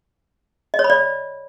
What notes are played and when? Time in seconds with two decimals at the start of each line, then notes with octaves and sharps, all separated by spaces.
0.74 D#5
0.79 C#5
0.84 B5
0.90 D5